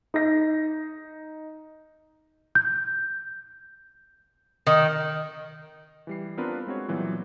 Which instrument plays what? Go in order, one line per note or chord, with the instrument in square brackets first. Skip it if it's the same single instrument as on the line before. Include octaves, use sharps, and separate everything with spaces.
[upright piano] D#4 A#6
[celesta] G6
[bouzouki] D#3
[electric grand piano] E3 G3 C7
B3 C4 D4 F4 A#4 B4
G#3 C4 F#4 C#5
A#2 E3 F#3 G3 B3